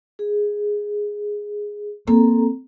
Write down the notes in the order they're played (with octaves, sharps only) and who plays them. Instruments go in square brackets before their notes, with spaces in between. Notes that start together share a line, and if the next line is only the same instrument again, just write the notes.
[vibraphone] G#4
[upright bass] A#3 [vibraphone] C4 A4 A#5